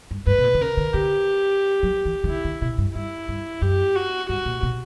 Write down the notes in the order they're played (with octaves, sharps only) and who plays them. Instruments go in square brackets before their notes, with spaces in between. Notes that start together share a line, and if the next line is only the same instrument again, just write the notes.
[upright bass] G2
[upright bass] G2 [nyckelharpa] B4
[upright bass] B2
A#2
D3
[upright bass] C#3 [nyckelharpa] A#4
[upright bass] D3
[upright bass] D3 [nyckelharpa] G4
[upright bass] F#3
E3
E3
[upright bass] D3 [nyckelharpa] E4
[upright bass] D3
B2
G2
[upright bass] G2 [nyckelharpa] E4
[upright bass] G2
[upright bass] F#2 [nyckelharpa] G4
[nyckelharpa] F#4
[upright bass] G2 [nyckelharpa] F#4
[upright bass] A#2
B2